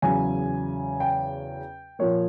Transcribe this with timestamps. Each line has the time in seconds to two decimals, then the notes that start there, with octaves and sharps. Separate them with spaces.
0.02 E2 C#3 F#3 G#5
1.00 G5
1.99 A#2 F3 A#3 C#5